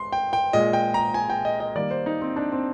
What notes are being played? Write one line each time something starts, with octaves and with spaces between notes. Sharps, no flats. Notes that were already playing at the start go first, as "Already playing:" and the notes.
Already playing: G#3 C6
G5
G5
A#2 G#3 D#5
G5
A#5
G#5
G5
D#5
D#5
D#3 G3 A#3 D5
C5
D#4
C4
D4
C4